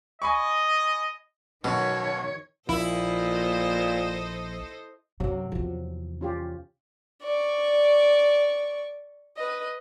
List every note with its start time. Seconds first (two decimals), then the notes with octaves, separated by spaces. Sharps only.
0.22 D#5 G#5 B5 C#6
1.64 B1 F#2 B2 D#3 C#5 C#6
2.69 A#1 A#2 E4 A4 C5 D#5
5.20 F#2 C3 F#3
5.52 E2 C3 F3
6.21 C#4 F4 G4
7.23 D5 C#6
9.37 B4 D#5